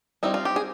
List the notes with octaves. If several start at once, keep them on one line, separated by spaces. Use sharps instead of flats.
G3 C4 D#4 E4
F4
G4
G#4